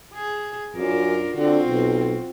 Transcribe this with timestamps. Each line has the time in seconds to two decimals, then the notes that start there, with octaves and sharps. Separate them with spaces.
0.14 G#4
0.76 F#2 D4 F4 A#4
1.35 D3 C4 F4 F#4
1.66 B1